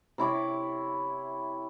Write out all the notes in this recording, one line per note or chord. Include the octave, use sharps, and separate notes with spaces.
C3 E4 C#5 D6